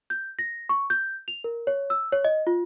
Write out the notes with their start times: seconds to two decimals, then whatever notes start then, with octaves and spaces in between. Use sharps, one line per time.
0.10 G6
0.39 A#6
0.69 C#6
0.90 G6
1.28 F7
1.44 A#4
1.67 C#5
1.90 E6
2.13 C#5
2.25 D#5
2.47 F4